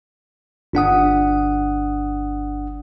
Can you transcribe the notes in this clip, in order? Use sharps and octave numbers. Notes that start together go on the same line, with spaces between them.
G1 D4 F#5 D#6